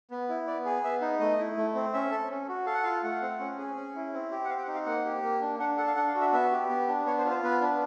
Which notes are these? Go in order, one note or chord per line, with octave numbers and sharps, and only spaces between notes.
B3
E4
B3 D5
G#4
B3 E5
D#4
A3 D#5
E4
A3
C4
C#4 E5
A4
C#4
F#4
A4 F5
F#5
F4 F5
A3 F#5
C4
C#4
G#4
C#4
E4
C4
G4
F#5
C4 F5
G5
F#5
D#4
F5
A#3 F#5
G4
A#3
D4
D4 F#5
A4 F#5
F5
D4 F#5
F5
F#4
E5
B3 E5
G4
B3
D4
B3 C#5
C5
F4
C5
B3 B4
D4